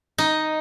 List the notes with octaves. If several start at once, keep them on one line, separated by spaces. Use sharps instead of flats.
D#4